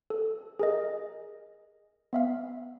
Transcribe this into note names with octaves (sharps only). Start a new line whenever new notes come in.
A4
G#4 A#4 D#5
B3 E5 F5